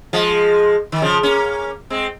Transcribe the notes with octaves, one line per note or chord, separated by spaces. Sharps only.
F3 G#3
D#3
C#3 F3
A#3 C#4
G#3 C4